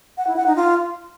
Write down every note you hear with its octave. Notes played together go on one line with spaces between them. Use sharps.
F#5
E4
F#5
D#4
F4